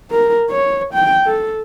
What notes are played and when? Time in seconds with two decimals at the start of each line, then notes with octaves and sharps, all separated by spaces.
0.11 A#4
0.50 C#5
0.94 G5
1.26 A4